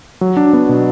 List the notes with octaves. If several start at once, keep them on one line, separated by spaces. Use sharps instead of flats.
F#3
D4
B3
B2